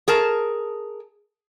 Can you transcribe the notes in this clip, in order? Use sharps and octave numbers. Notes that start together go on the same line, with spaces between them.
G#4 A#4 A5